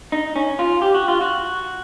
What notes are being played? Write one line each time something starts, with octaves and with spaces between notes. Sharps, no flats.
D#4
C#4
F4
G4
F#4
F4
F#4